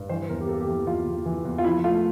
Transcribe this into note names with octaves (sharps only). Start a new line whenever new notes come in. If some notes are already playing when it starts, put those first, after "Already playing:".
Already playing: G2
E3 C5
E2 A#4
G4
A#3 A4
G4
E3 A4
E2 F4
E2
E3
E2
F4
F3 E4
A3 F4